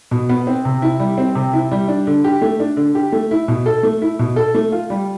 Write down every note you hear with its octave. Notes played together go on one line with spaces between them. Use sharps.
B2
B3
C4
C3
E4
G3
C4
C3
E4
G3
D4
D3
G4
A3
D4
D3
G4
A3
E4
B2
A4
A3
E4
B2
A4
A3
F4
G3